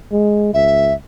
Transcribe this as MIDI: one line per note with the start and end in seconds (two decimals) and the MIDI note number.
0.12 0.53 56
0.53 0.96 37
0.53 0.93 76